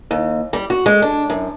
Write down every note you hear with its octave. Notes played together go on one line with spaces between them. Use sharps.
D#2
G3
F#4
G#3
D4
F#2